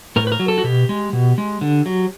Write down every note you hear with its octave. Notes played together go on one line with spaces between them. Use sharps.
A2 A#4
B4
A#4
F#3
A4
F#4
B2 G4
G#3
B2
G#3
D3
F#3